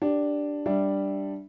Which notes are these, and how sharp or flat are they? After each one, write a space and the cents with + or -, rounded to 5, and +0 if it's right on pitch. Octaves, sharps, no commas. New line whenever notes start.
D4 +0 G4 +0
G3 +0 D4 +0 E5 +0